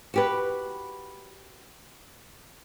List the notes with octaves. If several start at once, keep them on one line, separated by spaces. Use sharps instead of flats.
F#4 G4 B4